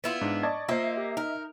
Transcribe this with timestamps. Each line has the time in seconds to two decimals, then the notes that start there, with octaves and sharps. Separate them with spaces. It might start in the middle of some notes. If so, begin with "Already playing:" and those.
0.04 B3 E4 F4
0.21 G#2 D4
0.43 D5 D#5 A5 C#6 G#6
0.69 A#3 F4 C5 D#5 E5
0.97 G4
1.17 D#4 A#4